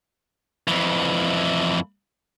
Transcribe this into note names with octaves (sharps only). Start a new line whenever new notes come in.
F2 E3